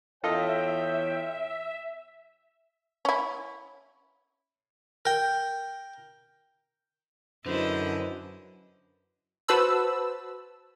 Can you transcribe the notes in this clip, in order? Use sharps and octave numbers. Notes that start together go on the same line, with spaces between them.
E2 F4 A4 C#5 D#5 E5 G5
C#4 E4
A#4 G5
F#2 D3 E4 B4 C5 D#5
F#4 B4 C5 A5 B5 E6